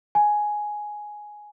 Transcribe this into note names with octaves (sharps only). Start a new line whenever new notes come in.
G#5